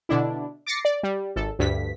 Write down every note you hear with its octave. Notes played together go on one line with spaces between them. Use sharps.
B2 D3 D4 E4
D6 A6 A#6 C7 C#7
D5
G3
G#1 A4
D2 G2 B6